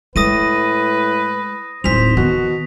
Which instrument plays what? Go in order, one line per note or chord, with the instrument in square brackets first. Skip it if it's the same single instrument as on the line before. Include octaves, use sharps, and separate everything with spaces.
[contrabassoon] A2 [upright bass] G#3 [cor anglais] B4 [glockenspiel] D#6 A#6 D#7
[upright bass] D1 E4 [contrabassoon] G#1 [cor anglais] C5 [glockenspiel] B6 F7
[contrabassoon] B2 [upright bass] D#3 [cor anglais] F#4